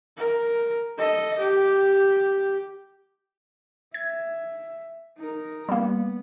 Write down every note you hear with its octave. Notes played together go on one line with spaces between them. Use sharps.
A#4
A4 D#5
G4
E5 G#6
D#4 A#4
G3 A#3 B3